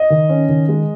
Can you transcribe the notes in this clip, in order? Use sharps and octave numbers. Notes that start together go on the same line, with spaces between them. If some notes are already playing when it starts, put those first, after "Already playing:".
Already playing: D#5
D#3
C#4
D#3
G#3